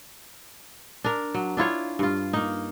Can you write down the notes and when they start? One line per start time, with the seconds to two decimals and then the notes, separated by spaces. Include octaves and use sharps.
1.04 D4 A#4
1.34 F#3
1.57 D4 E4 F4 C#5
1.99 G2 F4
2.33 A#3 D#4